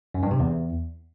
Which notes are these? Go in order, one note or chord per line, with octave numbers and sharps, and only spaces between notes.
F#2
G2
C3
E2